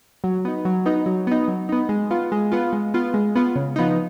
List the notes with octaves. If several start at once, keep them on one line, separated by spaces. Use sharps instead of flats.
F#3
B3 D#4
F#3
B3 D#4
F#3
B3 D#4
F#3
B3 D#4
G#3
B3 F4
G#3
B3 F4
G#3
B3 F4
G#3
B3 F4
C#3
F3 B3 D#4